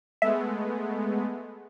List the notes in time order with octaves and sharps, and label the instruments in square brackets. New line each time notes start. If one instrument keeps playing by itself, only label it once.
[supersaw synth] G#3 A3 B3 [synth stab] E5